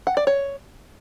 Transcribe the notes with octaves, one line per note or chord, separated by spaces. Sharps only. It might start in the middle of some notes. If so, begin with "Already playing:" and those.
F#5
D5
C#5